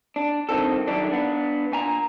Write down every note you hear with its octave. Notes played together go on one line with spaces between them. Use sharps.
D4
C2 D#3 C4 A4
F#2 D3 D#3 G3 D4
B3 D4
A#2 G#5 A#5